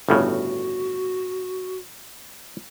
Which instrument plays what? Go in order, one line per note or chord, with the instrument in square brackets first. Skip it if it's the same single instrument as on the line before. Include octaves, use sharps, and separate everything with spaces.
[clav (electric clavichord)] G1 A2 C#3 [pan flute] F#4